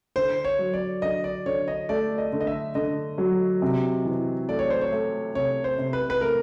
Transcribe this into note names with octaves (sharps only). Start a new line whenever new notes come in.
D3 C5
C#5
F#3
D5
D3 D#5
D5
D3 C#5
D#5
A3 D5
D#5
D3
D#5
E5
D3 D#5
F#3
C3
E3
A3 D5
C#5
C5
C#5
A3
C3 C#5
C5
C3
B4
B4
A3 A#4